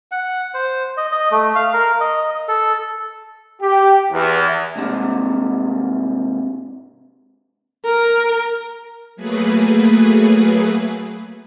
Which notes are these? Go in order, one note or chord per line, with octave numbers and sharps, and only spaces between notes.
F#5
C5
D#5
D#5
A3
F5
A#4
D#5
A4
G4
E2
C2 G#2 C3
A#4
F#3 A3 A#3 G#4 B4